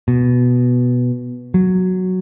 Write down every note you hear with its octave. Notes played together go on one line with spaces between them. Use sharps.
B2
F#3